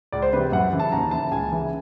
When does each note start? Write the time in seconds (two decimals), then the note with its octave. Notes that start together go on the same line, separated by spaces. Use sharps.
0.12 C#2 D5
0.22 C5
0.33 C3 E3 B4
0.52 F#2 F#5
0.72 C#3 E3
0.80 A5
0.92 D#2 A#5
1.11 C#3 E3 A5
1.31 C#2 G#5
1.52 C#3 E3